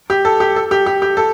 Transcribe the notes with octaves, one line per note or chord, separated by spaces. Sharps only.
G4
A4
G4
A4
G4
G4
G4
A4